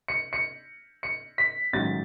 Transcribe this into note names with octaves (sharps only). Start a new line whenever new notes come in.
C#7
C#7
C#7
B6
A1 G#2 D#3 F#3 A6